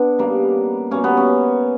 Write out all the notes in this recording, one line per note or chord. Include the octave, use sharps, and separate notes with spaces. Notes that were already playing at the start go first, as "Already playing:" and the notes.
Already playing: B3 D4
C#3 G3 A#3
B2 G3 A#3 C#4
B3
C#4